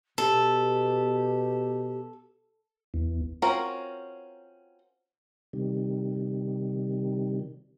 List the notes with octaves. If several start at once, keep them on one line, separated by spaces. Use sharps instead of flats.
B2 G4 A4
E2
C4 C#4 F4 F#4 A#4
C3 D#3 G3